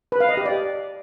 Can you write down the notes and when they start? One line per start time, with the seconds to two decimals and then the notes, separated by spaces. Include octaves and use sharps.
0.12 B4
0.20 F5
0.29 D#5
0.37 G4
0.46 D5